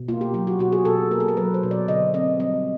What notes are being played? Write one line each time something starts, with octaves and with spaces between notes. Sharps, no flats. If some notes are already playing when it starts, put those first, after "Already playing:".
Already playing: B2
A#3 F4
G4
F#3 G4
F#4
B2 F#4
G#4
B2 A4
A#3 A#4
A4
A#4
F#3 B4
C5
B2
D5
D3 D#5
C4 D#5
G3 D#5